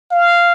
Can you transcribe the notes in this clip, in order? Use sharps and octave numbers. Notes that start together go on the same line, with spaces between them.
F5